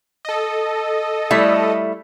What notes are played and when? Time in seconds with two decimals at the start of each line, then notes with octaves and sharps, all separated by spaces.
0.25 A4 D#5
1.31 G3 A3 E4